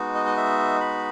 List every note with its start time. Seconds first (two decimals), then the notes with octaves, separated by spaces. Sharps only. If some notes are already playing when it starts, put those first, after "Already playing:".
Already playing: G#3 B3 D#4 F#4
0.15 D#5
0.26 D#5
0.37 E5
0.81 B5